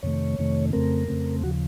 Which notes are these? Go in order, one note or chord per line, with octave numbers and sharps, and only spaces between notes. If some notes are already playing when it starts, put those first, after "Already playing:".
F2 C3 D#3 A3 C#5
F2 C3 D#3 A3
F2 C#3 A3 C4 A#4
F2 C#3 A3 C4
D#2 C#3 F3 F#4